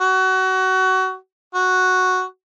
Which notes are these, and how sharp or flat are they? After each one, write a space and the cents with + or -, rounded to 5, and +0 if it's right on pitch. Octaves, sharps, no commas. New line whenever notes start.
F#4 +25
F#4 +0